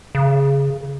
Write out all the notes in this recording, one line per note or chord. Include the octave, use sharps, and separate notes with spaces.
C#3